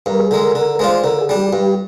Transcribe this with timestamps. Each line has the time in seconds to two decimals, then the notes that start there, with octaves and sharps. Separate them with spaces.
0.06 G2 A#4
0.19 G#4
0.31 D3 G#3 A#4
0.55 D3 A#4
0.75 A#4
0.79 G#3 D4 F4 C5
1.04 D3 A#4
1.21 G#4
1.29 G3 D4
1.37 G4
1.53 G2 G4